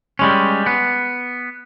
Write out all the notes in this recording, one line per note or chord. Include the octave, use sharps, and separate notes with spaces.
G3 G#3 C#4
B3